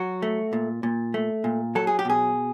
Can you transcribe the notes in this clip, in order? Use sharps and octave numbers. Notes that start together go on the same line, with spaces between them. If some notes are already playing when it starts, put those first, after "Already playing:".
Already playing: F#3 F#4
A3
A#2
A#2
A3
A#2
F#3 A4
G#4
G4
B2 G#4